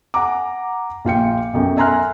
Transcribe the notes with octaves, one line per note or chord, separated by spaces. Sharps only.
F#5 G#5 A#5 D6
A#1 F4 G5 C#7
B1 F#2 G5
E5 G#5 A#5 C6 F6 F#6